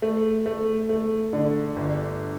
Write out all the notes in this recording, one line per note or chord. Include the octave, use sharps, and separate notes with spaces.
A3
A3
A3
D3
G1